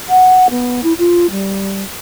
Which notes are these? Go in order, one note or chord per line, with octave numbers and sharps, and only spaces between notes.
F#5
B3
E4
F4
G3